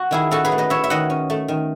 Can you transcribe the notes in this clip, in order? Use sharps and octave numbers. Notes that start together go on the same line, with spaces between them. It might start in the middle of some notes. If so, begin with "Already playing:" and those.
Already playing: F#4
D#3 E4 G#4
C#4 F#4 A4
G#4 B4
A3
B4 D#5
E4 C#5 E5
E5
D#3 D#5 F#5
C#4
A3
D#3